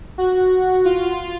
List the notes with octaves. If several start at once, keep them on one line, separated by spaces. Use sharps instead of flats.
F#4
F4